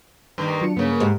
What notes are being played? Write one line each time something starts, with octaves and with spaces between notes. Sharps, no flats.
G2 D#3 A#3
F#3 D4 F4 C#7
G2 C#3 A#3 B3
G#2 G4 D#5 B5